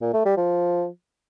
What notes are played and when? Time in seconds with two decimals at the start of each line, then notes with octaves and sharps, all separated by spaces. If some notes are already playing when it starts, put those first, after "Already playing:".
0.02 A#2
0.14 A3
0.25 G3
0.37 F3